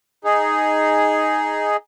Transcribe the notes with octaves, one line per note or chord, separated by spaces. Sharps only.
D#4 G#4